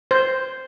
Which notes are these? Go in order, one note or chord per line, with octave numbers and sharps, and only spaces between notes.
C5